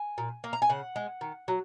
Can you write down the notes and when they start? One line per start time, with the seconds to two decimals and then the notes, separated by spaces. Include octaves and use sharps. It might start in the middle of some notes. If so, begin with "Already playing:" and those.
Already playing: G#5
0.18 A#2
0.44 A#3
0.53 A#5
0.62 G#5
0.70 C#3 F#5
0.96 G#3
1.21 D#3
1.48 F#3